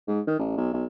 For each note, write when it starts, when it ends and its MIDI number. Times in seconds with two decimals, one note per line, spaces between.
0.08 0.21 44
0.27 0.34 51
0.39 0.57 33
0.57 0.69 35
0.73 0.85 35